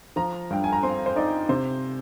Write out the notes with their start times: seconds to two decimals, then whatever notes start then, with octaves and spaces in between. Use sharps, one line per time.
0.16 F3 A#5
0.50 G2 G5
0.64 G#5
0.73 A#5
0.83 C4 C6
1.06 C5
1.16 D#4 D5
1.49 C3 C5